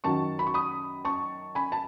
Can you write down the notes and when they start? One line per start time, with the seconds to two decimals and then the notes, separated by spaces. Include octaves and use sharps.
0.04 F#2 D#3 F#3 A5 C#6
0.39 B5
0.47 C#6
0.54 B5 D#6
1.05 A5 C#6
1.55 G#5 B5
1.72 A5